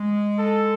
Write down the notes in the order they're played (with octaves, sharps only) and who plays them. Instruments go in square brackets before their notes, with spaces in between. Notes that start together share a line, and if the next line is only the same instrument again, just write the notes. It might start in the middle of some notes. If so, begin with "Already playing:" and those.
Already playing: [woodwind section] G#3
[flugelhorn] A4